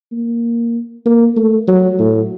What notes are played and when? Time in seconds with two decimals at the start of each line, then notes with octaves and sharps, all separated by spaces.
0.12 A#3
1.06 A#3
1.36 A3
1.68 F#3
2.00 A2